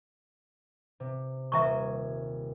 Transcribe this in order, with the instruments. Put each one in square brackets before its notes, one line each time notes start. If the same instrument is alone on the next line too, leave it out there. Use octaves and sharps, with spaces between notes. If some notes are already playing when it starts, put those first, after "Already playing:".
[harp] C3
[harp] D#1 G#5 [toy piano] E5 A#5 C#6